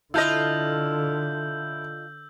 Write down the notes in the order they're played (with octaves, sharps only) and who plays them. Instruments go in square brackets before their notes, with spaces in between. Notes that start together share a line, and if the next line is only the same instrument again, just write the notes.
[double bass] D3 [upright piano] E4 [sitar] F4 A4 D#5 [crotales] E6 G6